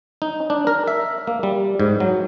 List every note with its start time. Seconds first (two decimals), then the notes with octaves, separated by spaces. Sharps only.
0.22 D#4
0.50 D4
0.67 A#4
0.88 E5
1.27 A#3
1.43 G3
1.80 G#2
2.00 F#3